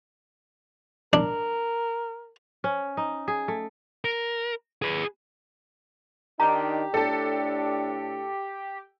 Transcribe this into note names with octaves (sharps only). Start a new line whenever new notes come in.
D4 A#4
C#4
D#4
G#4
A3
A#4
G#4 B4
D#3 D4 D#4 G4 A#5
A2 D4 A4 A5